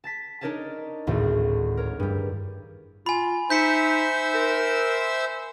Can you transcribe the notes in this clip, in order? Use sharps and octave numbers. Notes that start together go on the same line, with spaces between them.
A5 A6 B6
D4 D#4 A#4 C#5 D#5 A5
G#1 D2 A2
A#4 C#5
G2 G3
F4 G#5 B5
D#4 C5 E5 E6 G6 B6 C#7
A#4